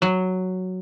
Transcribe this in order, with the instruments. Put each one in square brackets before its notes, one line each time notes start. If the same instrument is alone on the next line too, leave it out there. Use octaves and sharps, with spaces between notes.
[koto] F#3